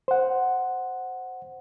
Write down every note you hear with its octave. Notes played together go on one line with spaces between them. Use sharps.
C5 F#5